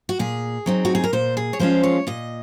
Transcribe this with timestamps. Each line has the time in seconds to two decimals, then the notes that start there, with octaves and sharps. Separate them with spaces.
0.09 F#4
0.19 A#2 G#4
0.66 F#3 C4 D#4
0.85 F#4
0.95 G#4
1.04 A#4
1.13 A#2 C5
1.37 G#4
1.53 C#5
1.59 F3 G#3 C#4 F4 C5
1.83 C#5
2.07 A#2 D#5